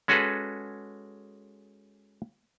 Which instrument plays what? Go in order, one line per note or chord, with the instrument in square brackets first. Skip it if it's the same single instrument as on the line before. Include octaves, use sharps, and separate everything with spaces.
[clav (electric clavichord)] G#3 C#4 F#4 G#4 A4 B4